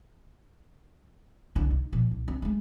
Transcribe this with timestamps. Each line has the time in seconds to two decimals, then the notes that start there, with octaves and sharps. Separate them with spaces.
1.55 C2 D3
1.71 D#4
1.92 A#2 F3
2.11 C2
2.28 C4
2.42 G#3 A3